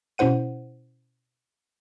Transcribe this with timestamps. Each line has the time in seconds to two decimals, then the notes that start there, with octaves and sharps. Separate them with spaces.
0.18 B2 C#4 E4 C5 F#5 D#7